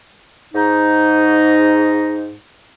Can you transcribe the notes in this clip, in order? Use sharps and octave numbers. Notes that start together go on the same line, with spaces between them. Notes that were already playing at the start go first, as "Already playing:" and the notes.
G#2 D#4